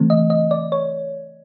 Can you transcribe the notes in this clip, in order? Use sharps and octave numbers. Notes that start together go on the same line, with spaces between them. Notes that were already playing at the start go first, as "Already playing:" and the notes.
Already playing: C#3 E3 A3 C4
D#5
D#5
D5
C#5